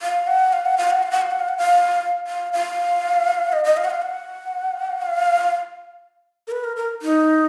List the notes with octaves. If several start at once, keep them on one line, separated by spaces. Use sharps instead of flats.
F5
F#5
F5
F#5
F5
F#5
F5
F#5
F5
F#5
F5
F#5
F5
F5
F5
D#5
D#5
F5
F#5
F5
F#5
F5
A#4
B4
A#4
A#4
D#4